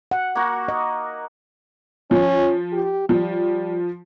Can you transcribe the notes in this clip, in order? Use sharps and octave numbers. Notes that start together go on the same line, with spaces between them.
F#5
A#3 F#4
D#5
F3 C#4
G4
F3 G3